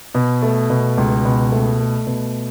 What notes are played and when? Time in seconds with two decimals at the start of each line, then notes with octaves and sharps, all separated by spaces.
0.15 B2
0.42 A3
0.70 B2
0.98 C#2
1.25 B2
1.52 A3
1.80 A3
2.07 B2